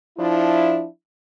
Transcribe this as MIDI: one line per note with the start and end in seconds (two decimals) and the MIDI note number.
0.19 0.86 53
0.19 0.86 62
0.19 0.86 64